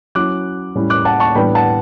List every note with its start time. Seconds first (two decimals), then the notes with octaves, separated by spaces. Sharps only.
0.15 F#3 C#4 E4 D6 F#6
0.75 A2 G3 C#4 E4
0.90 D6 F#6
1.05 F#5 A5
1.20 A5 C#6
1.35 A2 E3 G3 B3 D4 G5 B5
1.55 F#5 A5